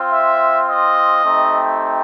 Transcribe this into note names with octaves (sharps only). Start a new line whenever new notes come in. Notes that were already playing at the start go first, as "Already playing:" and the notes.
Already playing: C4 F4
E5
D#5
A3 C4 D#4 G4